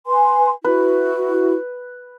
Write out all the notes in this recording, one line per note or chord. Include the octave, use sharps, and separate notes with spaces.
B4 G#5 C6
E4 F#4 B4